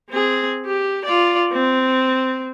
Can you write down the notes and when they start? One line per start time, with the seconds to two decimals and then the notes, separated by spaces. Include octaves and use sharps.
0.10 C4 G#4
0.66 G4
1.05 F4 D5
1.52 C4